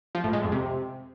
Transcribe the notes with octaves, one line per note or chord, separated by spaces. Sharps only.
F3
A2
G#3
F2
C3